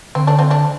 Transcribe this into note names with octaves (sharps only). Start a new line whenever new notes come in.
D3 C4
A3 D4
C4 F4
A3 D4